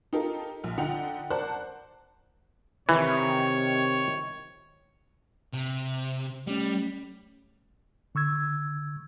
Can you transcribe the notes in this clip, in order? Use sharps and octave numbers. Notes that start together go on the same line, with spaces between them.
D#4 F4 G4 A4 A#4
A#1
D3 D#4 F4 F#5 G5 F7
A#4 C5 D5 F#5 A5 F#6
C3 D#3 E3 C#5
C3
G3 A3 C#4
D3 C#6 E6 G#6